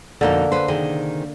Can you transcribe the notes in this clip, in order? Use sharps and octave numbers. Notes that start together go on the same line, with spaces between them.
F2 B2 D3 A#3 D#4
B4 C5
C3 D#3 G#4